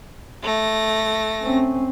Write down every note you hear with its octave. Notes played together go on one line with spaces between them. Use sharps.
A3 A#6
C4 C#4